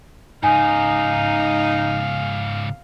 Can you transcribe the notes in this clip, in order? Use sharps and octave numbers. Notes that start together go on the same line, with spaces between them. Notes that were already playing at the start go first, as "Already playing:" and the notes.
G#2 C#3 D#4 F5 G#5